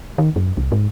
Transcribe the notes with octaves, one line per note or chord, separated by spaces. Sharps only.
D#3
F#2
C2
G#2